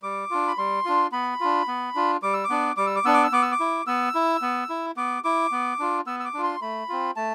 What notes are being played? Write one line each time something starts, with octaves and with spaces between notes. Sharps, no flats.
G3 D6
D4 F4
B5
G3 C6
D4 F4
B3 B5
D4 F4
B3
D4 F4
G3 D6
E6
D6
B3 D4
G3 D6
E6
D6
B3 D4 E6
D6
E6
B3 D6
E6
D6
E4
B3 E6
E4
B3
E4
B3 D6
E4 D6
B3
D4 F4
B3 E6
E6
D6
D4 F4
C6
A3 B5
C4 F4
A3 A5